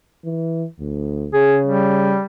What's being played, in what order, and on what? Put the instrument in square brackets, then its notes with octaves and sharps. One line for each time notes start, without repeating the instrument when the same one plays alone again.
[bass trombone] E3
D2
[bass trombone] C#3 [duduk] G#4
[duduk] G3